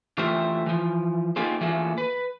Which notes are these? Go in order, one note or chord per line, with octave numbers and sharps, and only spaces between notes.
E3 A3 F4 G4 C5 E5
E3 F3
A#3 D#4 F4 G4 G#4 C5
E3 A3 A#3 F4 G#4
B4